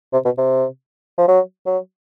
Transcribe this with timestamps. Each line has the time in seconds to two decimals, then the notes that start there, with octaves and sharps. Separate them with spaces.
0.13 C3
0.25 B2
0.38 C3
1.18 F3
1.28 F#3
1.66 F#3